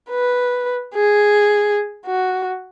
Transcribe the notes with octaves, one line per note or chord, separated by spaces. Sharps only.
B4
G#4
F#4